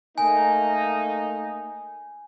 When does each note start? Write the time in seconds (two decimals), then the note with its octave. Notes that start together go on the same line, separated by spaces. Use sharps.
0.18 A3 A#3 D#4 G#5